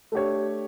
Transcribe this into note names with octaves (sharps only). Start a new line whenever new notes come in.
A3 D4 G4 C#5